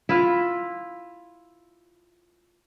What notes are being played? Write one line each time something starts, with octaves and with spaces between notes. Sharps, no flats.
E4 F4